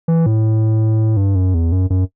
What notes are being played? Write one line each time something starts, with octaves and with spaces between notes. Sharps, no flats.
E3
A2
G2
F#2
E2
F#2
F#2